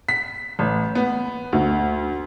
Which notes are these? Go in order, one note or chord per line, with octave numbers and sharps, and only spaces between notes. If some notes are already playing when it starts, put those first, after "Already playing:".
B6
A1
B3
D2